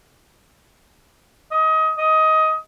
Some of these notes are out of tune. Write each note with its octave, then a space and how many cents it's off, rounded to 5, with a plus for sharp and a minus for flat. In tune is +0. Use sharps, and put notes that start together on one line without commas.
D#5 +25
D#5 +20